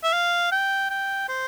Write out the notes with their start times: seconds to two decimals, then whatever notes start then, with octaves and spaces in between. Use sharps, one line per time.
0.04 E5
0.13 F5
0.52 G5
0.90 G5
1.28 C5